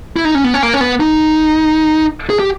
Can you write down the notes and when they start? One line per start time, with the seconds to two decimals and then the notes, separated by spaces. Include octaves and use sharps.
0.16 E4
0.25 D#4
0.35 C#4
0.44 B3
0.54 C#4
0.63 A#3
0.74 C#4
0.81 B3
1.00 D#4
2.30 G#4
2.39 G4